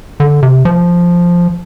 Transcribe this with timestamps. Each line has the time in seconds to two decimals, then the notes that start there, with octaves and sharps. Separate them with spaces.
0.20 D3
0.43 C3
0.65 F3